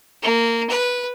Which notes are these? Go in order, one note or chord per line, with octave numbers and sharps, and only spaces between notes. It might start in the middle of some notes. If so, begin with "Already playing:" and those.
A#3
B4